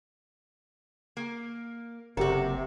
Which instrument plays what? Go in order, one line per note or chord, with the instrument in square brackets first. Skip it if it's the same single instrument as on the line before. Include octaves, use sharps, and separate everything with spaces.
[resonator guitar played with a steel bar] A#3
[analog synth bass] F#1 [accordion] C3 [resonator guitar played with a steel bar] F#4 A4 [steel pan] G4 A#4